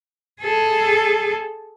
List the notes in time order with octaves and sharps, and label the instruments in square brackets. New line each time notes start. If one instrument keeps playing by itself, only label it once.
[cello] G#4 A4